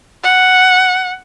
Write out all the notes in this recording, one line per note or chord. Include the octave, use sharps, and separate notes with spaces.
F#5